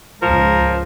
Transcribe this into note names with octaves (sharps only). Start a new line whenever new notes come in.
C#2 G#2 F3 A#4